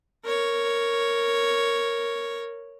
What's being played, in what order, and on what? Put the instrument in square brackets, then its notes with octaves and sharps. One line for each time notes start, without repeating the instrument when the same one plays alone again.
[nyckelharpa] A#4 C#5